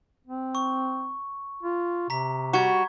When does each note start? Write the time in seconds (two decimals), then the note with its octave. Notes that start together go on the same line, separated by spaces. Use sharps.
0.27 C4
0.55 C#6
1.63 F4
2.10 C3 A#5 B6
2.53 G3 F#4 C#6 G#6